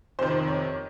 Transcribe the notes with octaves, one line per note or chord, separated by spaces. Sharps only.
F2 C3 D#3 C5
C#5